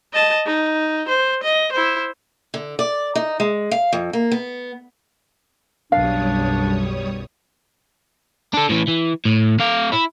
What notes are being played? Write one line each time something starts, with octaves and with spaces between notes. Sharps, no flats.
D#5 A5
D#4
C5
D#5
E4 C5
D3
D5
D#4
G#3
F5
F2
A#3
B3
B1 F#2 G3 D4 C#5 F5 D#6
D4 A4
A2 E3
E3
A2
A3 F5
E4